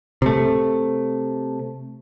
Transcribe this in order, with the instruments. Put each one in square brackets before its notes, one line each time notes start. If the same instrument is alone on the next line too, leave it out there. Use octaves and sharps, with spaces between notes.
[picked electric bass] C3 A3